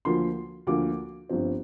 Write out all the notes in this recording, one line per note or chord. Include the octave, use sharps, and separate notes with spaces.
D2 D3 F3 A#3 C6
D2 D3 F3 A#3 D6
G1 G2 F3 C4